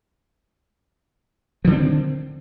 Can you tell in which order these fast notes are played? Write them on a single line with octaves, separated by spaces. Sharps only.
F3 D3 D#3 C4